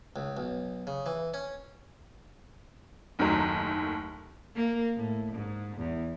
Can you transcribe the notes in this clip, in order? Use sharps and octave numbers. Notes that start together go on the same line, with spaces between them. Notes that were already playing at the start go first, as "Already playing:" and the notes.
C#2
B1
C#3
E3
C#4
F#1 D#2 D#3 F#3 A3 A#5
A#3
A2
G#2
E2